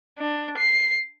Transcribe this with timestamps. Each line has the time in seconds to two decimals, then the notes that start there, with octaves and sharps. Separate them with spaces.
0.18 D4
0.57 C7